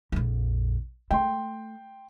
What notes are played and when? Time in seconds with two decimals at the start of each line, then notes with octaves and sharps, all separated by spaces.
0.12 A#1 F2
1.11 A3 G5 C6